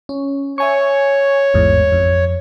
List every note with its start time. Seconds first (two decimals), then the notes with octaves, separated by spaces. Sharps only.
0.09 C#4
0.58 C#5 E5 G#5 C#6
1.54 A1 E2 G#2
1.92 F2